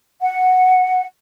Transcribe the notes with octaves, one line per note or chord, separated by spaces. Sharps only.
F#5